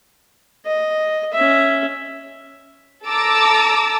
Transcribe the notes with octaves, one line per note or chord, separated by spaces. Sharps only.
D#5
C#4 E5
A4 A5 A#5 D6 E6